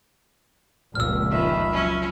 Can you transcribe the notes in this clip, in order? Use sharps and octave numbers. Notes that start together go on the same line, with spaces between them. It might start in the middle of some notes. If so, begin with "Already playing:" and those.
F1 C#2 A#2 E6 F6
F2 D#3 E5 B5
F3 F#3 C#4